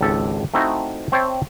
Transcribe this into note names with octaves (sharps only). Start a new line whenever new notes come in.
G#1 C#2 G4 A4
A3 C4 D#4 E4 F#4
C4 C5 C#5 E5 G5 A5